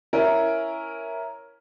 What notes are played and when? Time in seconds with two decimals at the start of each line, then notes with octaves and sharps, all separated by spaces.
0.13 C#4 E4 A#4